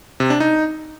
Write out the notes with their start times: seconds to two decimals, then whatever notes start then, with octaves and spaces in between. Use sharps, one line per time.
0.20 C3
0.30 D4
0.40 D#4